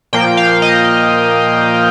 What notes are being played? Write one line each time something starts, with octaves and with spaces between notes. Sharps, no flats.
A#2 F3 A#3 G5
F5
D#5